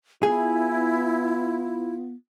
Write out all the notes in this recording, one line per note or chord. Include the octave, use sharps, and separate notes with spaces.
B3 E4 F4 G#4